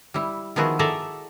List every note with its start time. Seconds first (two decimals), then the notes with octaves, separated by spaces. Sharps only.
0.14 G3 E4
0.56 D#3 F3 B3 E4 F#4 G#4
0.79 G#4 A4 D5 E5 A#5